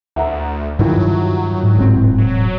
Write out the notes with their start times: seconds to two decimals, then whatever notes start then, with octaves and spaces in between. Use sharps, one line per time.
0.16 D2 E5 F#5 A#5
0.79 G2 D#3 F3 F#3 E4
1.63 G#2
1.77 E1 A2 C4
2.18 F#3